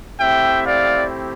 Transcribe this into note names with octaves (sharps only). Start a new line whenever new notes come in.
A3 C4 E4 G4 E5 G5
D5 F5